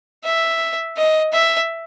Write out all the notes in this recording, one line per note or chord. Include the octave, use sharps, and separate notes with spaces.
E5
D#5
E5